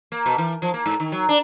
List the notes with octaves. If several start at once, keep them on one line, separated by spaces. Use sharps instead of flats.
A#3
B2
E3
F3
A#3
G#2
D#3
F#3
D4